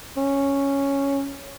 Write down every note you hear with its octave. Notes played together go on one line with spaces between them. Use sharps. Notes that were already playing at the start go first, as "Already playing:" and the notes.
C#4